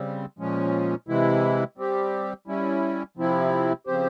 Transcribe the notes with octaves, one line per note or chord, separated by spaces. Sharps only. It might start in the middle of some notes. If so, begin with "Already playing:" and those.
Already playing: C#3 G3 C4
A#2 F3 G#3 C#4
C3 E3 G#3 E4
G3 C4 G4
G3 C#4 E4
C3 F3 C4 E4
C#3 F3 C4 G4 C5